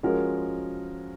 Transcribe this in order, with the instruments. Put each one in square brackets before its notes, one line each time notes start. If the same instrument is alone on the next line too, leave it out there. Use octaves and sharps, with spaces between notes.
[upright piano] F3 G#3 C#4 F#4 A#4